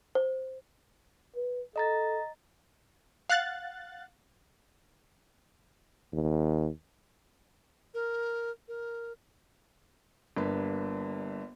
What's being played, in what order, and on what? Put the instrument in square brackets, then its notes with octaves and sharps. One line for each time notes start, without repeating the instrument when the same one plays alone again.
[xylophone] C5
[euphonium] B4
[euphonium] A4 [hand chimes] D#5 A#5 A6
[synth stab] F5 F#5 F#6 A6
[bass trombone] D#2
[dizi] A#4
A#4
[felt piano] G1 G2 A#3 B4